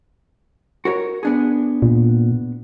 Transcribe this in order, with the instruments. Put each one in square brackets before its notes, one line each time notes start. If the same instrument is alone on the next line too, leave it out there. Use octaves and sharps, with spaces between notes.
[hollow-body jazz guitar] F#4 A#4 C#5
B3 D4 G#4
[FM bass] A#2